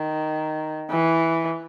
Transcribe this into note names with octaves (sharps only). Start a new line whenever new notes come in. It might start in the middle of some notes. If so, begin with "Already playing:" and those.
Already playing: D#3
E3